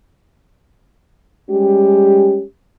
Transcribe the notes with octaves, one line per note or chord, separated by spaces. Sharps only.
G3 G#3 C#4 G4